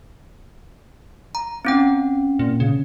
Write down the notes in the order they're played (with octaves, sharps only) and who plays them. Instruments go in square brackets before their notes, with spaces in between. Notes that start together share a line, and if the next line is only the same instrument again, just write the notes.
[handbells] A#5
C4 C#4 G5
[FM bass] A#2
C#3